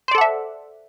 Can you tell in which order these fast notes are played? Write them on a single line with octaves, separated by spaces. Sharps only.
C5 D5 A4 F#5 E5